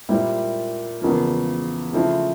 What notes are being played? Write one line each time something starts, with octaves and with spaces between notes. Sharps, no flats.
A#2 G3 C4 E4
E2 C#3 F3 A#3
C#3 F3 A3 C4 E4